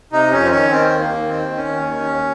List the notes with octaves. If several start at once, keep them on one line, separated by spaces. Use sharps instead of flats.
C3 D#4
F2 C#4
C4
D#3 C#4
D#3 C4
D#2
A#3
D#2
D#3 C4
D#3
C#4
D#2
D#3
D#2